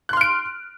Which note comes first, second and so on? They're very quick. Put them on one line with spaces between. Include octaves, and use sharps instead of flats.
F#6 C6 F6 D7